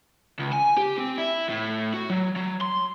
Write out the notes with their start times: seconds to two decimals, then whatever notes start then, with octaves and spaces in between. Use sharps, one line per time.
0.39 C#2
0.52 G#5
0.78 G4
0.99 C4
1.19 E4
1.49 A2
1.94 F#4
2.10 F#3
2.36 F#3
2.61 C6